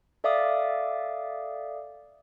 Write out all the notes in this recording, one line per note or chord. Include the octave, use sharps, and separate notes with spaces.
A4 D5 E5 F5 D6 D#6